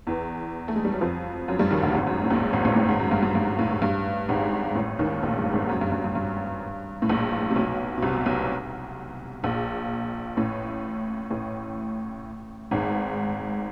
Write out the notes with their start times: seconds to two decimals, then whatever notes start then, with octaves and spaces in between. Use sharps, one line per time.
0.07 E2 E3
0.68 A3
0.76 G#3
0.85 G3
0.93 F#3
1.01 F2 F3
1.48 F#2 F#3
1.59 G2 G3
1.71 D#2 D#3
1.83 D2 D3
1.95 G#1 G#2
2.07 F#2
2.24 A2
2.30 A#1 A#2
2.52 G#1 G#2
2.65 A1 A2
2.76 A1 A2
2.88 G#1 G#2
3.00 F#2
3.11 G2
3.23 G2
3.35 G2
3.59 A2
3.71 G#2
3.82 G2
4.29 G#1 G#2
4.75 A1 A2
4.99 D#2 D#3
5.22 A#1 A#2
5.38 G2
5.53 G#1 G#2
5.69 F#2
5.81 G2
5.92 G2
6.04 G2
6.15 G2
7.02 A2
7.09 A#1 A#2
7.50 C3
7.56 B1 B2
7.98 B2
8.03 C2 C3
8.26 B1 B2
9.43 A#1 A#2
10.37 A1 A2
11.30 A1 A2
12.71 G#1 G#2